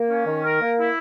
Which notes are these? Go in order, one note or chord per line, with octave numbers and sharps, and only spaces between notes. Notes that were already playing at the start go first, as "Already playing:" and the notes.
Already playing: A#3
C#4
D#3
A#4
A#3
E4